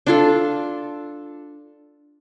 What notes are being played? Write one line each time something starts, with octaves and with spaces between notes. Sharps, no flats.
D4 F4 A4